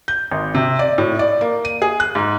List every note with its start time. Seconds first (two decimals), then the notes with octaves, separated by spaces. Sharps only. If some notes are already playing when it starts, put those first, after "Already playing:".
0.08 G6
0.32 G#1
0.55 C3
0.79 D5
0.98 A2
1.19 D5
1.41 A#3
1.65 D#7
1.82 G#4
2.00 F#6
2.15 G#2